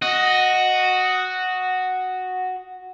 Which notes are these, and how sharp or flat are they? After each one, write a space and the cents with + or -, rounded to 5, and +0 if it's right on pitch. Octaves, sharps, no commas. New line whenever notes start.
F#4 +0 D#5 +5